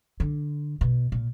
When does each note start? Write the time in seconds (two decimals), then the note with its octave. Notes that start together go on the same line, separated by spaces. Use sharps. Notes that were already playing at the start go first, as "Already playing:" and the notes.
0.20 D3
0.81 B2
1.12 A#2